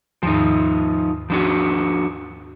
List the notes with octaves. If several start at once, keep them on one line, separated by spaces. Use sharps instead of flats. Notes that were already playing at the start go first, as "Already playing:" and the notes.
D#2 G#2 D#3 F3 D#4
F3 D4 F#4